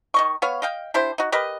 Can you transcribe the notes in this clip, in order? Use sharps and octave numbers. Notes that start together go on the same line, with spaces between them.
D#3 D#5 C#6
B3 C#5 F5
D#5 F5 G5
D4 E4 G4 C5
D#4 F#4
G4 A#4 B4 D#5